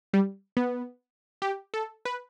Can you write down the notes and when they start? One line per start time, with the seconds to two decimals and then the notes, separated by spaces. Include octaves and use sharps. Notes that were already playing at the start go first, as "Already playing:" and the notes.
0.14 G3
0.57 B3
1.42 G4
1.74 A4
2.05 B4